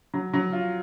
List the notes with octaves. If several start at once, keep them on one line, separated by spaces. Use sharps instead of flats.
F#3
F#3
F4